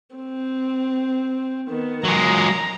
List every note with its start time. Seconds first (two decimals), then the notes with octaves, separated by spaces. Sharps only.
0.15 C4
1.68 D#3 B3
2.05 F#3 G#3 A#5